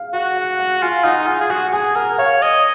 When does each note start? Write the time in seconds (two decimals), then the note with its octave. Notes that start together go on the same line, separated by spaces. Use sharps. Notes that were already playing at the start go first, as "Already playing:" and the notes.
Already playing: F5
0.14 F#4 F#5
0.37 F#5
0.59 F#5
0.82 F4 G#5
1.04 D#4 F#5
1.27 F4 G#5
1.41 G#4
1.50 F#4 F#5
1.69 F#4
1.73 G#4 G#5
1.95 A#4 F#5
2.18 C#5 F5
2.42 D#5